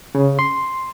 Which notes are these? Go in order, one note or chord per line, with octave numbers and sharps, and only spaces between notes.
C#3
C6